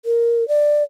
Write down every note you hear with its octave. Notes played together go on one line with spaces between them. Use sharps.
A#4
D5